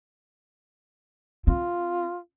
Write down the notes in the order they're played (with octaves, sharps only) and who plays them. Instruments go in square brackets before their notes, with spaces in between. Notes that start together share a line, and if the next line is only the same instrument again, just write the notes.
[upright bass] C4 [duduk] F4